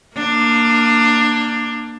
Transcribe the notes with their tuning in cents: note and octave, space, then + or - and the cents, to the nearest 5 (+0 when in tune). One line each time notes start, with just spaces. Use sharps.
A#3 +0 D4 +15